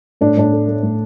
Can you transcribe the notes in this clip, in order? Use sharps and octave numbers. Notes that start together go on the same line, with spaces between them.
A2 D4
A2 D4
A3
A3
A2